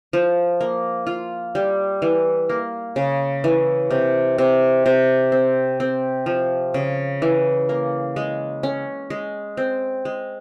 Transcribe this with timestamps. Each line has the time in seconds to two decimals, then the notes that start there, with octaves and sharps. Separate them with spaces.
0.13 F3
0.61 A#3
1.07 F4
1.55 G3
2.02 E3
2.49 A#3
2.96 C#3
3.44 E3
3.91 C3
4.38 C3
4.86 C3
5.32 C4
5.80 C4
6.26 F3
6.74 C#3
7.22 E3
7.69 A#3
8.16 G#3
8.63 C#4
9.10 G#3
9.57 C4
10.05 G#3